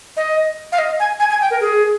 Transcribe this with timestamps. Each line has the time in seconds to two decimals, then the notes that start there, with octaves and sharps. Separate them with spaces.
0.17 D#5
0.72 F5
0.78 D#5
1.00 G#5
1.20 G#5
1.30 G#5
1.41 G5
1.51 A#4
1.61 G#4